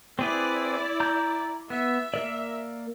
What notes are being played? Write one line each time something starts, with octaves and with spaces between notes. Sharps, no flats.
C4 E4 G#4 B4 D5
A#5 G6
B3 E5
A#3 A#4 D5